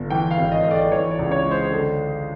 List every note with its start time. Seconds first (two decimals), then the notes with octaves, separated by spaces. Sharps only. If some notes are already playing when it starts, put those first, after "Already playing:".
Already playing: G1
0.10 E3 G5
0.31 F5
0.38 G#1
0.52 D#5
0.64 A3 D#5
0.71 D5
0.92 E3 C#5
1.11 D5
1.19 C#2
1.32 C#5
1.44 G#3
1.51 C5
1.72 D3